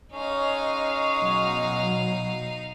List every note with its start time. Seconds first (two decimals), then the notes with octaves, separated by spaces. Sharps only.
0.13 G#3 C#4 D#4 F5
1.20 B2 F#3